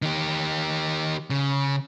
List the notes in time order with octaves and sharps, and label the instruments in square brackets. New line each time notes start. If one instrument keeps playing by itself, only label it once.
[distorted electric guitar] D#3 G4
C#3